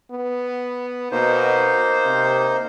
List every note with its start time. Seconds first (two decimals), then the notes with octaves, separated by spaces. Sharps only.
0.11 B3
1.12 B2 A#3 D#4 C5
2.05 C3